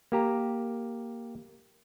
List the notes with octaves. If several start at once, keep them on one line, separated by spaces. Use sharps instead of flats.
A#3 G4 A#5